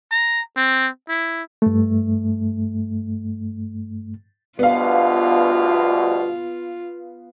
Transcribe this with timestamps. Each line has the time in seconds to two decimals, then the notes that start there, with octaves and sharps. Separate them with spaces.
0.11 A#5
0.57 C4
1.09 E4
1.62 G2 A3
4.59 D2 G2 B2 B3 F4 F5